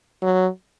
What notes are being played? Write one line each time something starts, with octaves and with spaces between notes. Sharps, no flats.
F#3